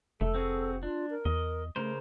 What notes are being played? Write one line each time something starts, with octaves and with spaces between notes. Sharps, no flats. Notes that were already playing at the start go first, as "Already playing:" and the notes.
F1 A3 A4
C4 F#4 G#4
D4 F4
A#4
E2 D#5
C#3 A3 A#4 C5